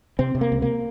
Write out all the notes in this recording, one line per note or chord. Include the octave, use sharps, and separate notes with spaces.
C3 C4
C3
A#3
C#2
A#3